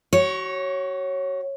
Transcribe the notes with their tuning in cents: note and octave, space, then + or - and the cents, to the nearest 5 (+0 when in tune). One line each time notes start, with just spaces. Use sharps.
F#4 +35 C#5 -10